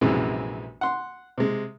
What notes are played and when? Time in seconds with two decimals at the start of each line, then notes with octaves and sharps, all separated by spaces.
0.01 A#1 F#2 C3 E3 G#3
0.81 F#5 C6
1.38 C3 G#3